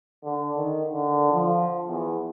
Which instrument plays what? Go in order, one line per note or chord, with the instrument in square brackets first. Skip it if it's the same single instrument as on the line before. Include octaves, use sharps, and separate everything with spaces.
[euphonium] D3
D#3
D3
F3
E2